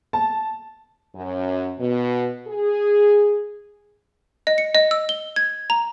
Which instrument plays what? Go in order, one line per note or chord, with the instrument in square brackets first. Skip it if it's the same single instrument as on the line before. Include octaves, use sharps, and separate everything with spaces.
[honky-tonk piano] A5
[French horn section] F#2
B2
G#4
[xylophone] D#5
C#7
D#5
E6
G7
G#6
A#5